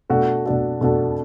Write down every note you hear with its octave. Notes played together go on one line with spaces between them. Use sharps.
B2 A3 D4 F#4 A4
B2 A3 D4 F#4 A4
B2 A3 D4 F#4 A4